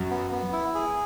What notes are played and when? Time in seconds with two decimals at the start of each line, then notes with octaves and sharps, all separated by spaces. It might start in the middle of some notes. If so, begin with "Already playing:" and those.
Already playing: F#2 F#3
0.10 B3
0.32 B3
0.53 E4
0.75 G#4